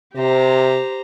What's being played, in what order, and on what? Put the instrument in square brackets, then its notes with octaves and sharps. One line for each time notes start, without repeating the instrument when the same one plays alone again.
[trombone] C3 [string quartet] G4 C5 A#5